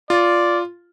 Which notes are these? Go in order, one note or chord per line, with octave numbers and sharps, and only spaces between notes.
F4 D5